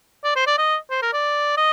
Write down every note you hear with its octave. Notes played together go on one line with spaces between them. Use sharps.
D5
C5
D5
D#5
C5
A#4
D5
D#5